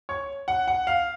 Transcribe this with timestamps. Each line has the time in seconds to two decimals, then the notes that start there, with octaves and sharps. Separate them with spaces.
0.09 C#5
0.48 F#5
0.67 F#5
0.87 F5